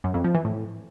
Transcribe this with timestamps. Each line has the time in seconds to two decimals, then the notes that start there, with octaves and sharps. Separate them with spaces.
0.04 F#2
0.14 F2
0.24 F3
0.35 E3
0.45 A2